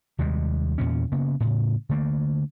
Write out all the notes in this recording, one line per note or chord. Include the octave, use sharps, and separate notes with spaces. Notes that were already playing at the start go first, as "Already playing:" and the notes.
D#2 C3 G3 G#3
E2 A#2 C#4
C#3 A#3 B3
A2 C#3
D3 A3 A#3